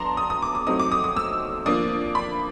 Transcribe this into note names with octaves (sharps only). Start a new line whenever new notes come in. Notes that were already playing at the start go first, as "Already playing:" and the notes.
Already playing: F#3 B3 D4 A5 A#5 C6
D#6
D#6
D6
D#6
F#3 A3 C4 D#4 D#6
D6
D#6
D#6
E6
F3 A#3 D4 D#6
B5